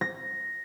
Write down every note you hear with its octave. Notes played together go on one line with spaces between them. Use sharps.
A#6